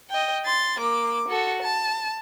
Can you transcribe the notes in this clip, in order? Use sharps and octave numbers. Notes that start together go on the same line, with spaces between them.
D#5 G5
C6 A6
A#3 D6
F#4 A4
A5